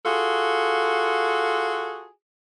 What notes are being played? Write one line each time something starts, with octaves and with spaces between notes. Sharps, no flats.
F4 F#4 G#4 A4